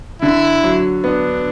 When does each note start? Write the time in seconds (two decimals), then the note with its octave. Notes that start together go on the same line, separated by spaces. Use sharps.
0.22 D3 E4
0.63 F#3
1.03 B3 D4